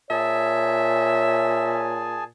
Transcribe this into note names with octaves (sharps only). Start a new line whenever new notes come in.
A#2 G#4 C#5 E5 G#5 A5